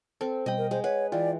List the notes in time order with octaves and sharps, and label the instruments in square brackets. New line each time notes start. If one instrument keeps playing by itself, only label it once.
[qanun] C4 [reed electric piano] A4
[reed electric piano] B2 G3 G5 [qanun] D#5 B5
[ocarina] A#4
[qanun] G#3 [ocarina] C5
[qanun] B4 [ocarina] C#5 [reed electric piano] F#5
[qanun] E3 [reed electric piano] F4 G5 [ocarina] D5